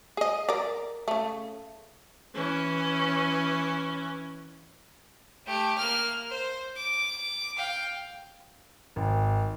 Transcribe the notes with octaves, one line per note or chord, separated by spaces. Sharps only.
G#4 D#5
A#4 D5
C#3 A3
E3 C#4
A3 G4
A#3 F6
C5
D6
F5 G5
G#1